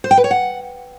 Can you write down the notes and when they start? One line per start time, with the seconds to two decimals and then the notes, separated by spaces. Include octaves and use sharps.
0.04 C5
0.11 G5
0.17 B4
0.24 C#5
0.31 F#5